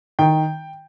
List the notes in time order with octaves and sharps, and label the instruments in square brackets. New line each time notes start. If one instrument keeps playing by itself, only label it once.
[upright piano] D#3 G5